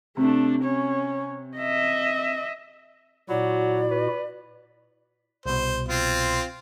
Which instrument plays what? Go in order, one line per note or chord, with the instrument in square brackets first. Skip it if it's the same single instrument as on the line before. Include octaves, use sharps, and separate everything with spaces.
[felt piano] C3 [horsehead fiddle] A3 D4
[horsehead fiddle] C#4 C#5
D#5 E5
[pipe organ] A#2 E4 F#4 [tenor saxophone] F#3 [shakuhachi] D5
[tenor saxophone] B4
[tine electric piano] C2 B2 [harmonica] C5
[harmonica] C4 F4